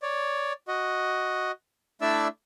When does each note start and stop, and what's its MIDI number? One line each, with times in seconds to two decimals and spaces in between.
0.02 0.53 73
0.02 0.53 74
0.68 1.51 66
0.68 1.51 75
2.01 2.28 57
2.01 2.28 62
2.01 2.28 64
2.01 2.28 74
2.01 2.28 76
2.01 2.28 88